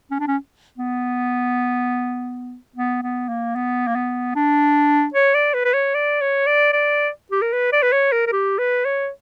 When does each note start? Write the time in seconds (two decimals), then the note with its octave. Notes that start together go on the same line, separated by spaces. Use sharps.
0.11 C#4
0.20 D4
0.28 C#4
0.78 B3
2.76 B3
3.02 B3
3.29 A#3
3.56 B3
3.87 A#3
3.96 B3
4.35 D4
5.14 C#5
5.34 D5
5.54 B4
5.65 B4
5.74 C#5
5.94 D5
6.21 C#5
6.47 D5
6.73 D5
7.32 G4
7.42 A#4
7.53 B4
7.73 D5
7.83 B4
7.92 C#5
8.12 A#4
8.27 A#4
8.32 G4
8.59 B4
8.85 C#5